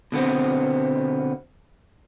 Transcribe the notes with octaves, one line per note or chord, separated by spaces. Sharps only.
B2 D3 B3 C4